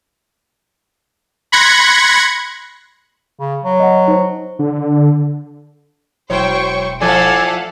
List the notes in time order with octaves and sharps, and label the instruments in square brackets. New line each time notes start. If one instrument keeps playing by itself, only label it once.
[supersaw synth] B5 C6 F#6 G#6 A#6 C#7
[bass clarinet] C#3
F#3
[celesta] D#5 F#5
D#4 C5
[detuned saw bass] D3
[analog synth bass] E1 [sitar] F#3 E4 C#5 [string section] C5 G5 C#6
[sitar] F3 A3 E4 [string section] A4 F5 F#5 [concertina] D5 G#5